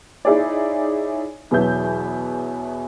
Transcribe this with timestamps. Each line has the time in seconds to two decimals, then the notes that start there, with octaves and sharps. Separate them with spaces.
0.25 D#4 E4 G#4 C#5 D5
1.51 E2 B2 E3 F#3 E5 G6